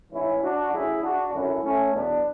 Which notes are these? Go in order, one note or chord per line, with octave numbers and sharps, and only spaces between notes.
A1 G#2 E3 C#4 E4
D4 F#4
A1 A2 F#3 E4 G#4
D4 F#4
G#1 F#2 D3 F#3 C#4 E4
A3 C#4
E2 B2 F#3 B3 D4